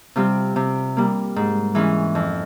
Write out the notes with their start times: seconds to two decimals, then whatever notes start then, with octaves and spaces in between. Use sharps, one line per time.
0.16 C3 G3 C4 F4
0.56 C3
0.97 G3 A#3
1.36 G#2
1.75 E3 G#3 C#4
2.15 F2